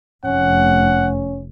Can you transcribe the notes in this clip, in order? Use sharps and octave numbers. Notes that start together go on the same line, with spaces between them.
F1 C#4 F#5